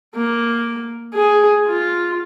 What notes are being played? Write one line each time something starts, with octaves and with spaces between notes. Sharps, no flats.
A#3
G#4
F4